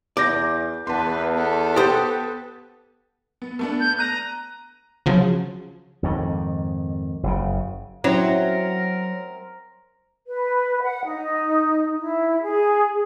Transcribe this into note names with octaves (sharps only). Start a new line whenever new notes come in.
E2 D5 D6 G6 A#6
E2 B3 B4 A5 C6
B3 A4
G4 C5 G5 D#6 A6
B3
A3 B3 D4
G6
A#5 F#6 D#7
C#3 F3 F#3
F2 G#2 D#3
F#1 C#3
F#3 C4 C#4 E4 A#4 C5 E5
B4
F#5
D#4
E4
G#4